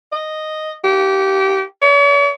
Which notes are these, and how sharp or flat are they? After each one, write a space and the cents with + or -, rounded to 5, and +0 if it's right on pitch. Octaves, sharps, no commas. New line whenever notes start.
D#5 -5
G4 -25
C#5 +45